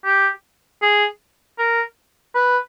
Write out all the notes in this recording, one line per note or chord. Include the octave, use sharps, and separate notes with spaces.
G4
G#4
A#4
B4